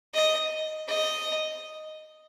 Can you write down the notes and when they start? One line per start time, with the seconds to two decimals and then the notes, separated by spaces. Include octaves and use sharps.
0.14 D#5
0.88 D#5